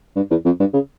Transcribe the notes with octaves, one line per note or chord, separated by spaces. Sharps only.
G2
E2
F2
G2
C#3